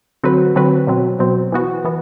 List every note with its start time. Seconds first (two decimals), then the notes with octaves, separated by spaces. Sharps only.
0.23 D3 F#3 C4 F#4 B4
0.55 D3 F#3 C4 F#4 B4
0.87 B2 F#3 C4
1.19 B2 F#3 C4
1.52 E3 B3 F#4
1.84 E3 B3